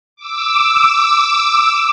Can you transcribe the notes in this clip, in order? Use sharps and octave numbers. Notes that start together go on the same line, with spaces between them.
D6 E6